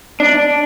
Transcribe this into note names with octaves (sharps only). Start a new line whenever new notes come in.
D4